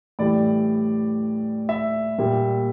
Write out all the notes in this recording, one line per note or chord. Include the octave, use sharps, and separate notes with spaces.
A2 E3 G3 D5
E5
A#2 G3